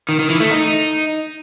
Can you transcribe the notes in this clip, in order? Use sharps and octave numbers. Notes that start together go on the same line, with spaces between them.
D#3
D#3
E3
A3
D#4